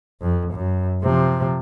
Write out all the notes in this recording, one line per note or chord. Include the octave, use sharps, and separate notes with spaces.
F2
F#2
C3 F3